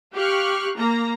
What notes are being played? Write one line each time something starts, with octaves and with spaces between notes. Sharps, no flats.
G4 F5 G5 C#6 F6 F#6
A#3 A#5